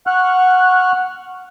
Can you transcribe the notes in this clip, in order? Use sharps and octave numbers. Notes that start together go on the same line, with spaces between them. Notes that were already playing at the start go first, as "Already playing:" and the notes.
F#5 C#6 F6 F#6